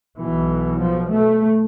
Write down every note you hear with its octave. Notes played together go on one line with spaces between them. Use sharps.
B1 B2 E3
F3
A3